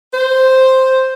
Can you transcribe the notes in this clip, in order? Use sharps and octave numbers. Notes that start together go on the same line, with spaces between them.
C5